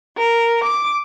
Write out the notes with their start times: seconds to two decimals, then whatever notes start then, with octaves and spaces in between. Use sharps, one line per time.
0.16 A#4
0.64 D6